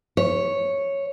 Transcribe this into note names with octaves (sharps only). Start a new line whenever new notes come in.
C#5